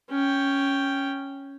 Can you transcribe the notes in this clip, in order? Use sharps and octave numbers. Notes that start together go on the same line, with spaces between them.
C#4 G5